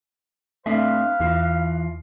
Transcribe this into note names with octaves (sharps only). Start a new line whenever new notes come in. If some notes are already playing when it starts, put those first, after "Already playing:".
A3 C4 D4 B4 E5 F5
E2 E3 F4